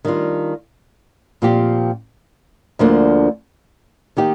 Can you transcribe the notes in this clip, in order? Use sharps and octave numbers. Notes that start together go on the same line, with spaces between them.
D#3 G3 D4 F4
A#2 F3 C4 G4
D2 D3 F3 A#3 D4
D#3 A#3 D#4 G4